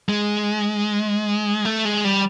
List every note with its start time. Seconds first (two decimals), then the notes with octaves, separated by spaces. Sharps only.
0.09 G#3
1.65 A3
1.85 G#3
2.04 G3